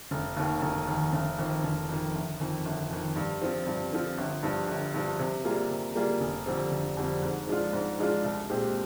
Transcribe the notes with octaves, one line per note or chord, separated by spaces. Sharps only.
F1
D#2 D#3
F1
D#2 D#3
F1
F2 D#3
F1
F2 D#3
G1
F2 D#3
G1
F2 D#3
G2
F3 C4 F4
G2
F3 C4 F4
G1
G2 F3
G1
G2 F3
C3
G3 A#3 F4 G#4
C3
G3 A#3 F4 G#4
F1
F2 D3 G3 C4
F1
F2 D3 G3 C4
G#2
F3 G#3 D4 F4
G#2
F3 G#3 D4 F4
C2
A#2 G#3 C4 G4